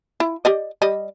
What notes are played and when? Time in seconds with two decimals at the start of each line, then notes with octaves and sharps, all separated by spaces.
0.20 E4
0.45 G4 D5 D#5
0.82 G3 D5 D#5